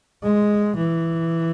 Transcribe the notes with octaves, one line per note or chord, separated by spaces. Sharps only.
G#3
E3